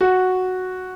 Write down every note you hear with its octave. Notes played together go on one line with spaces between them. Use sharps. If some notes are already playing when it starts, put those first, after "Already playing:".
F#4